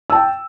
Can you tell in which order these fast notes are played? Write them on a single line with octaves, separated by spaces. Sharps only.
E6 A5 G5